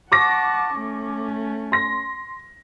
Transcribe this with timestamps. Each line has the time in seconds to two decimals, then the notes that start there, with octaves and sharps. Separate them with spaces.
0.12 F#5 A5 C#6 D6 A#6
0.76 A3 C#4
1.72 C6 A#6